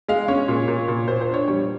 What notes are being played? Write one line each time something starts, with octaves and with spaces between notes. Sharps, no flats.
G#3 F5
C#4 C#5
A#2
A#2
A#2
A#2 C5
C5
D4
C#5
G3 C#5